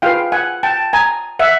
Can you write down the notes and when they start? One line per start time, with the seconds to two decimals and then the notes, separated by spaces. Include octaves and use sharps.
0.02 F4 G#4 B4 F5 G5
0.32 F#5 G#5
0.63 G5 A5
0.93 G#5 A#5
1.39 E5 F#5